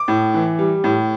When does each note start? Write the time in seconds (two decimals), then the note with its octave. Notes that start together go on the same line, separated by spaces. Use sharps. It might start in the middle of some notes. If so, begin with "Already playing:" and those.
Already playing: D6
0.08 A2
0.34 E3
0.59 G3
0.84 A2